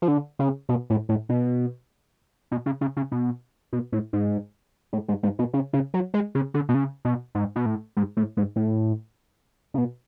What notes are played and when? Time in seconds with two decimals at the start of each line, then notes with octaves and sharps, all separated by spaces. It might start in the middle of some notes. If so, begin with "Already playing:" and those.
0.02 F3
0.08 D3
0.39 C#3
0.69 B2
0.90 A2
1.09 A2
1.29 B2
2.51 B2
2.66 C#3
2.81 C#3
2.97 C#3
3.12 B2
3.73 B2
3.92 A2
4.13 G#2
4.93 A2
5.08 G#2
5.23 G#2
5.39 B2
5.53 C#3
5.73 C#3
5.94 F#3
6.14 G#3
6.35 C#3
6.54 D3
6.69 B2
6.75 C#3
7.05 B2
7.35 G#2
7.56 B2
7.66 A2
7.97 G#2
8.17 A2
8.37 G#2
8.56 A2
9.74 C#3
9.78 B2